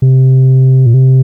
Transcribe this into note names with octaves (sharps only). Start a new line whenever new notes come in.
C3
A#2
C3